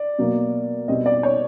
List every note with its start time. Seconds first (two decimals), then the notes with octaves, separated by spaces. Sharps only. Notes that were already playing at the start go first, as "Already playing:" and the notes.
Already playing: D5
0.18 B2 F#3 A#3
0.88 B2 G3 C4 D#5
1.06 D5
1.23 C#5